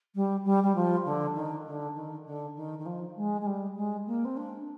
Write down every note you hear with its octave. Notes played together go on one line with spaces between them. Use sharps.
G3
G3
G3
F3
D3
D#3
D3
D#3
D3
D#3
D#3
F3
G#3
G#3
G3
G#3
A#3
C4
D4